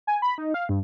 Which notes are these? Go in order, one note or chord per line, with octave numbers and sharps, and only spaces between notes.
G#5
B5
D#4
F5
G2